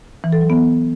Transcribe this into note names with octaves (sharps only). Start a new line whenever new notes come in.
E3
A4
F#3
B3